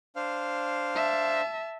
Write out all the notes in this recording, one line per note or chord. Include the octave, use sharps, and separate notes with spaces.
D4 C5 F5
E5 A5